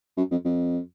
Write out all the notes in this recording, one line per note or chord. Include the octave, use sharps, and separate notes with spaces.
F#2
F2
F2